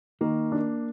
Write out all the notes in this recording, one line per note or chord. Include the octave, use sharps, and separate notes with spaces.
D#3 A#3
D4